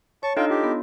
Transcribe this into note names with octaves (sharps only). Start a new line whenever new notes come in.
C#5 A5 C#6
D4 D#4 F4 A4 D#5 G5
F4 G4
B3